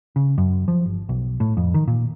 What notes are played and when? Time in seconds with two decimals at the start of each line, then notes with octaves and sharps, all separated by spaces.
0.16 C#3
0.38 F#2
0.68 F3
0.86 G1
1.09 B1
1.40 A2
1.57 F2
1.74 D#3
1.87 A#2